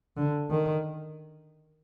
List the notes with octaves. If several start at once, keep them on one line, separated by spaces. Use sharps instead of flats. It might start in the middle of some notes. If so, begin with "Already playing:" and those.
D3
D#3